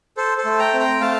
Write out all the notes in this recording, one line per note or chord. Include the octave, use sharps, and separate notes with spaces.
A4 C5
A4 C5
A3
G5 A#5
C4
G5 A#5
A3 F5 A5